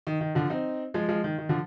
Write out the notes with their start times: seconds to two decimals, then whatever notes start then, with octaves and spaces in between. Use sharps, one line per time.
0.07 D#3
0.21 D#3
0.35 D3 F3
0.50 C4 D#4
0.94 F3 G#3
1.08 F3 G#3
1.24 D#3
1.38 D#3
1.49 D3 F3